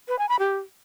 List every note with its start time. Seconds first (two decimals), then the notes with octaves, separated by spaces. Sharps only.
0.08 B4
0.19 G#5
0.29 B5
0.39 G4